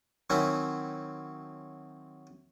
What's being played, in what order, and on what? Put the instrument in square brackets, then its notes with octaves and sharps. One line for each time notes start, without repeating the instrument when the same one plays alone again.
[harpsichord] D#3 F#3 C4 C#4 D#4 E4